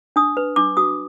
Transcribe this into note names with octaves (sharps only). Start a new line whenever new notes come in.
D4 D#6
B4
D4 D6
F#4 D#6